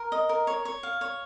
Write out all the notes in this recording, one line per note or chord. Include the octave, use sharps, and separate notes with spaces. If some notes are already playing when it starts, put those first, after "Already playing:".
Already playing: A#4
D#5
A#4
C#5
C#5
F5
C#5